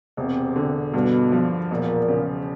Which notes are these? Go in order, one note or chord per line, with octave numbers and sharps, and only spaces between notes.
E1 C3
D3
G2 B2
F3
E1 A#2
C#3